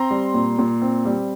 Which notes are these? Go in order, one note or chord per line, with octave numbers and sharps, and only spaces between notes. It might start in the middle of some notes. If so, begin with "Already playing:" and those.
Already playing: C4 A#5 C6
G3
A#2
A#2
C4
G3